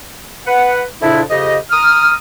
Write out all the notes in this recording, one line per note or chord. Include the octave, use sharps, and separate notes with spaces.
B4 F#5
F2 A#2 C#3 D4 E4
F2 C#3 G4 D#5
A#5 D#6 F6